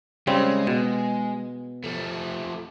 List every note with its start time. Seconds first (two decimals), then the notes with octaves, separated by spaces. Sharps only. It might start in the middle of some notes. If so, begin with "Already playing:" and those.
0.27 C#3 G3 G#3 C4
0.67 B2
1.84 F3 A3